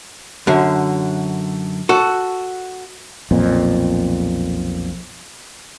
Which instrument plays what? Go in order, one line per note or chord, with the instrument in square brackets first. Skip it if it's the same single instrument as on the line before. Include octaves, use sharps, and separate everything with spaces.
[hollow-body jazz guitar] F#2 D3
F#4 A4
[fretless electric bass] B1 F2 A#2